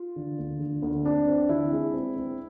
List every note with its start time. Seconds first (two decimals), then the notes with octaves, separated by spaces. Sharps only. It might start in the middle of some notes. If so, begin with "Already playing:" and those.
Already playing: F4
0.16 D3
0.39 D2
0.60 D3
0.83 D2
1.05 C4 D4
1.27 C4
1.49 D3 E4
1.72 G#3
1.94 C4
2.16 C4